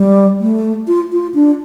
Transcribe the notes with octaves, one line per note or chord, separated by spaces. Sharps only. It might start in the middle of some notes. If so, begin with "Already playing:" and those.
Already playing: G3
A3
F4
F4
D4